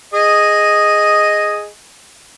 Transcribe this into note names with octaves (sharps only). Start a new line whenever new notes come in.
G#4 D#5